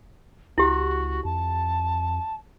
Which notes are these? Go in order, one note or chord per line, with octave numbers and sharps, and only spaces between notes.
C#2 E4 F#4 G4
F2 A5